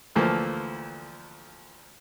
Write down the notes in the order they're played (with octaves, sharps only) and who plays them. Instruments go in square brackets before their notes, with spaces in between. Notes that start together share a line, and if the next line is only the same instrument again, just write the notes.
[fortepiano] D2 E3 F3 A3 A#3